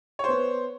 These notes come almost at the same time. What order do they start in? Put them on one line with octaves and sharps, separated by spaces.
C#5 C5 B3